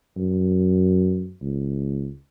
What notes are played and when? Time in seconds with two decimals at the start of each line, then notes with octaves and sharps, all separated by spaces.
0.17 F#2
1.41 C#2